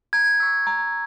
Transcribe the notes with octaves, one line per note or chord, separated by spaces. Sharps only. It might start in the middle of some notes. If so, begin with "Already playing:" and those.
A#5 G#6
C#6 E6
A#5